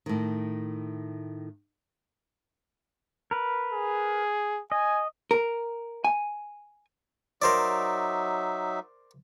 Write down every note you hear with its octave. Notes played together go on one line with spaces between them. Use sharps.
A2 D#3
A#4 B4
G#4
D#5 G#5
A#4
G#5
F#3 D#4 A#4 C5 D5 E5